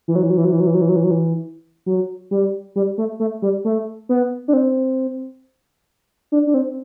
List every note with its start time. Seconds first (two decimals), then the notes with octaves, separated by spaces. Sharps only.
0.08 E3
0.15 F#3
0.23 E3
0.30 F#3
0.37 E3
0.45 F#3
0.52 E3
0.60 F#3
0.67 E3
0.74 F#3
0.81 E3
0.89 F#3
0.96 E3
1.04 F#3
1.11 E3
1.86 F#3
2.31 G3
2.76 G3
2.98 A3
3.20 A3
3.42 G3
3.65 A3
4.09 B3
4.48 D4
4.53 C4
6.32 D4
6.47 D4
6.54 C4